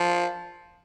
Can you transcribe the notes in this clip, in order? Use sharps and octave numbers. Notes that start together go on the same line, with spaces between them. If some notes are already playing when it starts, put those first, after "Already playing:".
Already playing: F3